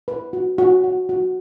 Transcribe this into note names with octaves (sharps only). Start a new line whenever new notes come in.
B4
F#4
F#4
F#4
F#4